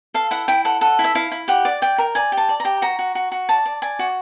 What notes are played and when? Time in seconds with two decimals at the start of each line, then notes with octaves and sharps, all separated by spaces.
0.14 A4 F5
0.31 E4 F#5
0.48 E4 G5
0.65 A4 F#5
0.81 A4 F#5
0.99 E4
1.04 E5
1.15 E4 F5
1.32 E4
1.48 G4 F#5
1.65 D5
1.82 D5 G5
1.98 A#4
2.15 D5 G#5
2.32 G4
2.37 A5
2.49 D5
2.60 G4 A#5
2.82 F#4 A#5
2.99 F#4
3.15 F#4
3.32 F#4
3.49 D5 A5
3.66 D5
3.82 D5 G#5
3.99 F#4